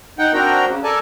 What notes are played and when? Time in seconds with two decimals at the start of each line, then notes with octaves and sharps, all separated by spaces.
0.19 D#4 F#5 G5
0.34 C4 D4 F#4 A#4 G5 A#5
0.68 C#3
0.84 A4 A#4 D5 G#5 A5